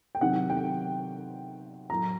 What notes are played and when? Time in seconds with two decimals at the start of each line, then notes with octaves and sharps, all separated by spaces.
0.15 G5
0.21 C3 D#3 F#3 F#5
0.50 G5
1.90 A2 F#3 A#5